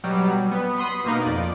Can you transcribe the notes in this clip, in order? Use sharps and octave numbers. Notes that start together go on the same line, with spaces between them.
B2 F#3 G3
B3
B5 C6 D#6
B2 A#3 D#4
F2 D5